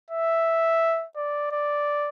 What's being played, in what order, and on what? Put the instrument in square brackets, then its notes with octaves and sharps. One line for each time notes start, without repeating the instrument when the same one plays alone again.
[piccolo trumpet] E5
D5
D5